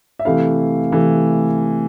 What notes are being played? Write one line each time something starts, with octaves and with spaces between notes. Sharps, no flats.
E5
C3 E3 A3 E4 F5
C3 E3 A3 E4